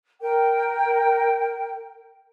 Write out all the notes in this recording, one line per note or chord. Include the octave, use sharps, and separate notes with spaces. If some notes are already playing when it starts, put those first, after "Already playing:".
A#4 G5